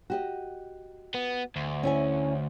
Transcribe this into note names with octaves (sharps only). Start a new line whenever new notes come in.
F#4 G4 D#5
B3
D2
C#4 E4 G#5